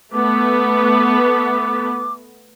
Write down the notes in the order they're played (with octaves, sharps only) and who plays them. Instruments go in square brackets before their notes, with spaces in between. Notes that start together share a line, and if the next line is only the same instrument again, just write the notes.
[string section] A3 B3 [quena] D6